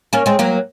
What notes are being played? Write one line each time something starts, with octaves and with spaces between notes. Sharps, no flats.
A#3 C#4
G#3 C4
F#3 A#3